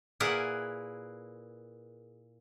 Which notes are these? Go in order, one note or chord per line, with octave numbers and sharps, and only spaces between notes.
A#2 E4 G#4 A#4 B4 F#5